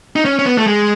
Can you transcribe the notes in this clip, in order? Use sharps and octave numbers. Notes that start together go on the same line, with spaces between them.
D#4
C#4
C#4
B3
A3
G#3